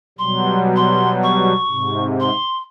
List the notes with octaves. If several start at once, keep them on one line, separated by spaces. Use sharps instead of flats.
B2 F#3 G3 C6
C6
C#6
G#2 C3
C6